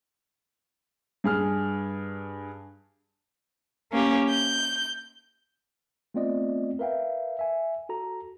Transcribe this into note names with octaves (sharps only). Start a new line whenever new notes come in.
G2 G#4 F6
A#3 C#4 G4
G6
A3 B3 C4 F4 D5 D#5
A#4 B4 E5 F5 G5
E5 G#5
F#4 A4 A#5